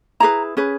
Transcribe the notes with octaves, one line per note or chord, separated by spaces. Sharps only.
E4 G#4 B4 A#5
C#4 G#4 B4